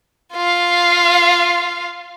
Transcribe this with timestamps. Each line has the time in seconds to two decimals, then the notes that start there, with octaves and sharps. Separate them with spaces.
0.34 F4 F5